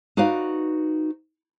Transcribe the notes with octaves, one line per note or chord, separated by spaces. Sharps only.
D#4 F#4 B4 D5 F5